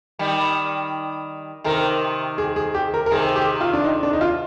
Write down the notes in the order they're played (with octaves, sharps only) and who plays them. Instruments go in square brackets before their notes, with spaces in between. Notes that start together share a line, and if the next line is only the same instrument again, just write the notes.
[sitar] D#3 G3
[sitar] C3 D#3 [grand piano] A#4
[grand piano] G#4
G#4
G4
A#4
A#4
[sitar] C3 D#3 [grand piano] G#4
[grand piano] G4
F4
D4
D#4
D4
D#4
F4